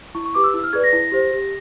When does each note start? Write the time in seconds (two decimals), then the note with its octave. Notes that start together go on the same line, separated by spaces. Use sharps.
0.15 E4 C#6
0.25 C#6
0.35 G4 B4 D6
0.44 E6
0.54 E4 E6
0.63 F6
0.73 G#4 B4 D5 G#6
0.84 A#6
0.93 E4
1.12 G4 C5
1.31 G4